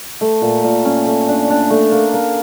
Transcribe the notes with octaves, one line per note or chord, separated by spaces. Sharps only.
A3
A#2
A#2
C#4
A3
D4
D4
A3
A#3
A#3